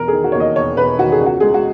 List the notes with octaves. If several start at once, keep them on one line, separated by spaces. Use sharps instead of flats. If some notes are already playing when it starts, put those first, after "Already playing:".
Already playing: E1 A#4
D#3 G#4
F#4
C#5
D#2 D#5
E1 C#5
E1 B4
D#3 F#4
G#4
C#2
F#4
G#3 G#4
F#4